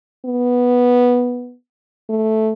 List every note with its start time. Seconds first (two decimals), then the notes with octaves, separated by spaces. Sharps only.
0.25 B3
2.09 A3